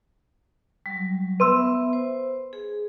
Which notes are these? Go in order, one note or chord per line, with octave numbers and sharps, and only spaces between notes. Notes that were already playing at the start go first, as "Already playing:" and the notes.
F#3 G3
B3 B4 E5 C6 E6
C5
G#4